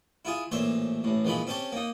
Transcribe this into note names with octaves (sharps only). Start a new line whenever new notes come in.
E4 F4 G#4
A1 A#2 C5 C#5 E5
A1 A2
A#1 E3 G#3 F4 B5
C4 C#4 G4 A4 C#5
A#3 D#4